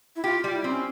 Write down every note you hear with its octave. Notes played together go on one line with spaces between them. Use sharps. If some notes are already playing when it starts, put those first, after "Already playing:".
E4
F4 G4
F4
G3
E4
C4
C#4